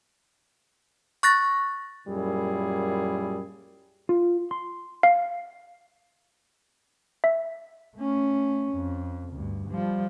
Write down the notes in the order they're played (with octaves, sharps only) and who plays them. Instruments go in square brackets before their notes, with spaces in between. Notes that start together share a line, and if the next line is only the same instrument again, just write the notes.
[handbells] C#6 F#6 A6 A#6
[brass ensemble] F#2 A#2 G3 E4 G#4
[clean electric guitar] F4
C6
[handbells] F5
E5
[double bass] A3 C#4
F2
D2 G2
F3 G3